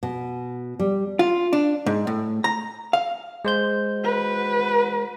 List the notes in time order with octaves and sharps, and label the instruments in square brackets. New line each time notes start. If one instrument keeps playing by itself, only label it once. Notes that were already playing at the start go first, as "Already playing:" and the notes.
[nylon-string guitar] B2
G3
[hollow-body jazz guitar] F4
D4
G#2
A2
A#5
F5
[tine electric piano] G#3 C5 G6
[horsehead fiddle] F#4 B4